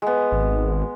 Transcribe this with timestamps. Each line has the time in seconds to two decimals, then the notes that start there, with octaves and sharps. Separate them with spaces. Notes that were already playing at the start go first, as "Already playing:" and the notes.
0.02 G#3 B3
0.32 G#1